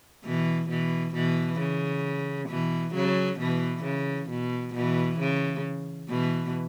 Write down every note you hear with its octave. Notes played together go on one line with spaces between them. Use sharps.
B2 E3
B2 E3
B2 E3
C#3
B2 E3
C#3 F#3
B2 E3
C#3
B2
B2 E3
C#3
B2 E3